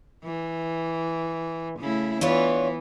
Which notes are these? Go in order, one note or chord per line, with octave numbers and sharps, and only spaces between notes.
E3
C#3 A3 E4
E3 B3 D4 F4 C#5